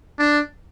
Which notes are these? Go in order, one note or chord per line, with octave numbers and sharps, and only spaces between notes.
D4